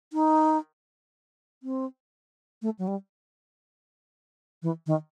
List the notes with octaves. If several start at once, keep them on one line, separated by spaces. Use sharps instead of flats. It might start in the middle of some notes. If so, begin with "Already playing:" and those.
D#4
C4
A3
F#3
G3
E3
D#3